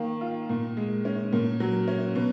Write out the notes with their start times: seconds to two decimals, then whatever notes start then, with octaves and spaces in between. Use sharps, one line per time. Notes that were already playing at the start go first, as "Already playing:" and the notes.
Already playing: D#3 A#3
0.21 F4
0.49 A#2
0.77 G#3
1.05 C#4
1.33 A#2
1.60 F#3
1.88 C#4
2.15 B2